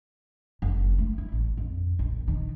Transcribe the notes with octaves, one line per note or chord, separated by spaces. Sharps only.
F#1
A3
E4
A1
F2
A#1
D#3